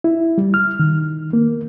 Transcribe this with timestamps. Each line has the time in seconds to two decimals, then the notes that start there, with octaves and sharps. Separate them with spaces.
0.04 E4
0.38 G3
0.54 F6
0.79 D#3
1.33 A#3